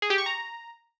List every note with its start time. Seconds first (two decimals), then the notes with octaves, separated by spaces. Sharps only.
0.02 G#4
0.10 G4
0.18 C#6
0.26 A#5